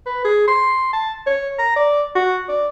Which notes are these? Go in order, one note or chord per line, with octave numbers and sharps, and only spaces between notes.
B4
G#4
C6
A5
C#5
A#5
D5
F#4
D5